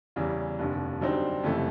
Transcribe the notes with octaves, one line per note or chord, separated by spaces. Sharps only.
E2 C#3 E3 G3
F1 D#2 D3
F#2 D3 G3 C4 D#4
F#1 F2 C3 E3 A3